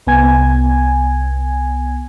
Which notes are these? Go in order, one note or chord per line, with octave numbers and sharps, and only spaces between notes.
C2 B3 G#5 G#6